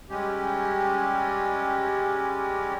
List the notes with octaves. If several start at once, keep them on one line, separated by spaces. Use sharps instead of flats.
G3 G#3 C#4 G4